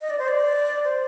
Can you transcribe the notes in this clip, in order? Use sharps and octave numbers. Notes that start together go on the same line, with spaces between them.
D#5
D5
C5
D5
C5